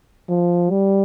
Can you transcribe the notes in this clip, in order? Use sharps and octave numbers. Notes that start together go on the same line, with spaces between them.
F3
G3